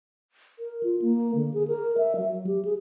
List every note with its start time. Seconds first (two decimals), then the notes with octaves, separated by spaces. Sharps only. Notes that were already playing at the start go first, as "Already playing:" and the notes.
0.59 A#4
0.83 F4
1.02 A#3
1.35 D3
1.54 G#4
1.68 A#4
1.98 E5
2.17 F#3
2.47 G4
2.65 G#4